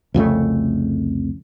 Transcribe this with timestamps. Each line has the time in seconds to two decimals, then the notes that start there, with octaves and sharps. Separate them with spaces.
0.14 C2 F2 C#3 A3